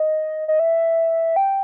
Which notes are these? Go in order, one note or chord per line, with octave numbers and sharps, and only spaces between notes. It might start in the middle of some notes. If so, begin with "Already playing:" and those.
Already playing: D#5
D#5
E5
G5